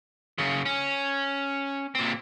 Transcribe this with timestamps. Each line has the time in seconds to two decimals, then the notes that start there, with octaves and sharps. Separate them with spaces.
0.38 F#2 C#3
0.66 C#4
1.95 A#2 C4